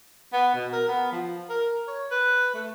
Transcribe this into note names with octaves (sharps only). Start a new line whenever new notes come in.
B3
B2
A#4
B3
F3
A#4
C#5
B4
A3